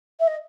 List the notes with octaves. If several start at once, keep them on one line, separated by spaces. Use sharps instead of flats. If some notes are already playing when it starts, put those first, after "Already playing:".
E5
D#5